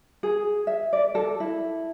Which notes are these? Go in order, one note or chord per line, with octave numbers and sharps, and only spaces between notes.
G#4
E5
D5
A4
E4